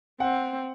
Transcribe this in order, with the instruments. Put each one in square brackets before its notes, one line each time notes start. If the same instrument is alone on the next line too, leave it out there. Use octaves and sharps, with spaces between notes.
[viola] C4 [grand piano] F#5